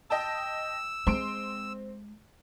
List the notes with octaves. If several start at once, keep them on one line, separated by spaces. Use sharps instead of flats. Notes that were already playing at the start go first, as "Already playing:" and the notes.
D#5 G5 A5 E6
G#3 C4 C6 D7